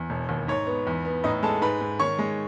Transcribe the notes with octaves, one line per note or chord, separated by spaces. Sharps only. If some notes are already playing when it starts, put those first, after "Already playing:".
Already playing: E2
E1
D#2
G#2 C#5
B3
E2
B3
A2 D#4 D#5
G#3 A4 A5
G#2 B4 B5
G#2
D#3 C#5 C#6
G#3